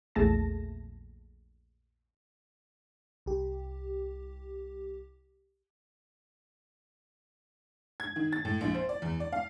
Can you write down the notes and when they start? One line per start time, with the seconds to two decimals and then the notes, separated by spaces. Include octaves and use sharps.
0.15 A#1 E2 A3 G#4 A5 A#6
3.26 C2 G4
8.00 G#6
8.16 D#3
8.33 A6
8.45 A2
8.61 A#1
8.75 C5
8.89 D5
9.02 E2
9.20 D5
9.32 F5